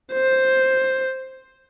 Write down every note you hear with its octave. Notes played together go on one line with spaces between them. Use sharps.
C5